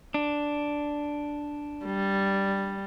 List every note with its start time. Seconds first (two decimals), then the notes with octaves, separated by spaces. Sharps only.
0.14 D4
1.85 G3